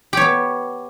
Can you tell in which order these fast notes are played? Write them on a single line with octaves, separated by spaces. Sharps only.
G4 C#5 B3